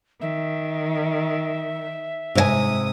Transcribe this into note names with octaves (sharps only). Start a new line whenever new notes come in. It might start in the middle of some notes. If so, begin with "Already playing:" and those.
D#3 E5
G#2 C3 C#5 G#5 D#6